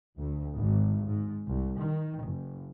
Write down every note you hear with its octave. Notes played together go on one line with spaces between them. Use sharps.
D2
G#1
G#2
C2
D#3
F#1